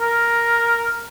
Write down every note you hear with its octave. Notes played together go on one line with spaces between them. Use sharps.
A#4